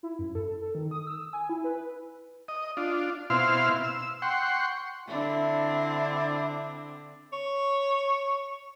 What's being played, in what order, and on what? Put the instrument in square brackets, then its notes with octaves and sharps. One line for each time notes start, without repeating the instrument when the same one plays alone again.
[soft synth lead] E4
F#2
A4
A4
D#3
D#6
E6
G#5
E4
B4
[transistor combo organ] D#5
D4 F4
B2 C4 E4 F5 C6 F6
E6
F#5 G5 C6 C#6
[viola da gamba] D3 C4 D4 [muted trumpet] E4
[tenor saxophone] C#5